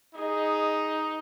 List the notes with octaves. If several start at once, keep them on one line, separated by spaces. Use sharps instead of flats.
D#4 G#4 D#5